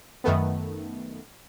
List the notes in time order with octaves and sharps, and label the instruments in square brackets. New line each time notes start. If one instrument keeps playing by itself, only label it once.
[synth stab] F#2 D#3 A3 B3